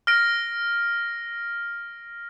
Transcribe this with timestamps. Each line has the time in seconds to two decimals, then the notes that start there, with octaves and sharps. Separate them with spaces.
0.07 F6 A#6 D7